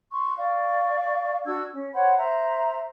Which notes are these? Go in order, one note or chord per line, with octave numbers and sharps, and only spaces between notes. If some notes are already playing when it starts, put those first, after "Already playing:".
C6 C#6
D5 F5 C#6
D4 F#4 E6 G#6
C#4
C5 C#5 F#5 B5
C5 E5 A#5